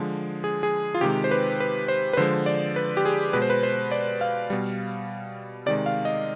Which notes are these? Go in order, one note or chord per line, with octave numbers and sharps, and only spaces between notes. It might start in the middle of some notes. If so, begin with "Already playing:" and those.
Already playing: D3 F3 G#3
G#4
G#4
F4
C3 D#3 G#3 G4
C5
B4
B4
C5
B4
D3 F3 G#3 C5
D5
B4
G4
G#4
B2 G#3 B4
C5
B4
C5
D5
F5
B2 G3
C3 D#3 G#3 D5
F5
D#5